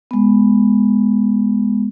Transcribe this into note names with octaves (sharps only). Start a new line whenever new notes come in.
G#3 B3